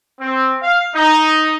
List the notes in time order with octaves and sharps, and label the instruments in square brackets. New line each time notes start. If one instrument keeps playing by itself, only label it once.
[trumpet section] C4
F5
D#4